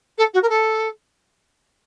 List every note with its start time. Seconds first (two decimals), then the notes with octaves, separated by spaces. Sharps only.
0.17 A4
0.33 F#4
0.42 A#4
0.49 A4